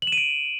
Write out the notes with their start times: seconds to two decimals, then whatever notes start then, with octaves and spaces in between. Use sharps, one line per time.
0.02 F#7
0.07 E7
0.12 D#7
0.17 D7